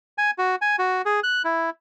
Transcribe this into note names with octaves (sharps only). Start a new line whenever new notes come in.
G#5
F#4
G#5
F#4
G#4
F#6
E4